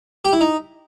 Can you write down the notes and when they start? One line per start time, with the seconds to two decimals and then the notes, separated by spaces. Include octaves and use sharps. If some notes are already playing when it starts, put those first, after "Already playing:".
0.25 G4
0.33 E4
0.41 D#4